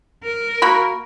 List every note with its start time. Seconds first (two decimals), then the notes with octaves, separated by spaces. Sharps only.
0.24 A#4
0.62 A#3 F#4 B5